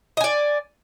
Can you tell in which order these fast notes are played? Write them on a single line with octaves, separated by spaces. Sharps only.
D#5 G#5 D5